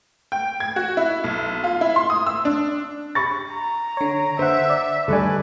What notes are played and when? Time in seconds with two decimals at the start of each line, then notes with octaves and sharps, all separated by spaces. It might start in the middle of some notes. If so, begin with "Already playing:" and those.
0.32 G5
0.60 G#6
0.76 F#4
0.97 E4
1.24 B1
1.64 F4
1.81 E4
1.96 C6
2.10 D#6
2.26 E6
2.45 D4
3.15 B5 C#6 A6
3.52 A#5
3.97 D3 C#5
4.39 D3 C5 E5 F#5
4.70 D5
5.08 D2 G2 A4 B4 D5 G#5